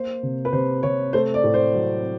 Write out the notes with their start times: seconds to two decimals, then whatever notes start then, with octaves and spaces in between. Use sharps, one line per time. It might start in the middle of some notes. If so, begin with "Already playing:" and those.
Already playing: A#3 C5
0.23 C3
0.45 B4
0.52 C3 C5
0.83 C3 C#5
1.13 A3 C5
1.34 D5
1.44 A2
1.54 C5
1.74 F#3